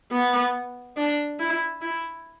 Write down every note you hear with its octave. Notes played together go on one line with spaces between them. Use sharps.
B3
D4
E4
E4